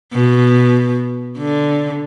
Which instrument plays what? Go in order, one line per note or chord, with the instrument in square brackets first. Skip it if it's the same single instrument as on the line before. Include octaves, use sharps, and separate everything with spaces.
[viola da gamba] B2
D3